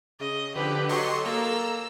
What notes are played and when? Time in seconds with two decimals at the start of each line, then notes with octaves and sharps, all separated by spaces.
0.20 C#3 D#5
0.56 D3 F3 G4 B4
0.89 F#3 A4 D#5 C6 C#6
1.25 A#3 A#5 E6